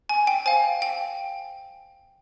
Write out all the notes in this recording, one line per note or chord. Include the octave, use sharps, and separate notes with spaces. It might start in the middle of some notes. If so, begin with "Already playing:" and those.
G#5
G5
C5 F5 G#5
G5